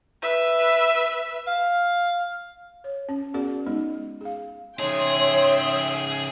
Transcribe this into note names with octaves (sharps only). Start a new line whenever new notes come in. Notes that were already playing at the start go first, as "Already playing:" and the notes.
B4 E5
F5
C#5
C#4
B3 C#4 F#4 G#4 A#4 D5
G#3 B3 D#4
G#4 F5
C#3 D#4 G#4 C#5 E5 G5 C6